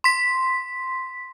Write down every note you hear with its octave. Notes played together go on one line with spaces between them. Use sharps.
C6 B6